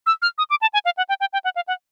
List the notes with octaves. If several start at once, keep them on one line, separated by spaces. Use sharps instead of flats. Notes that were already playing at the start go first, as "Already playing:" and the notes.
E6
F6
D#6
D6
A5
G#5
F5
F#5
G5
G5
G5
F#5
F5
F#5